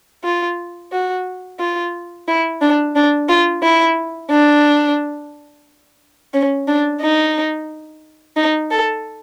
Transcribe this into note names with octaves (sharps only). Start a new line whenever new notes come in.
F4
F#4
F4
E4
D4
D4
F4
E4
D4
C#4
D4
D#4
D#4
A4